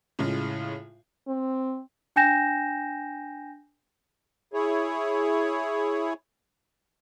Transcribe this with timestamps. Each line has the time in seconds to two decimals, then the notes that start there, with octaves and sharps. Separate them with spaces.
0.19 A2 C#3 G#3 F4
1.28 C4
2.16 D4 G5 G#5 G6 A#6 E7
4.53 E4 G#4 C#5